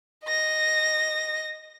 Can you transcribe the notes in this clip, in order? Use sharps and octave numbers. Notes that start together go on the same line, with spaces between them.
D#5 A#6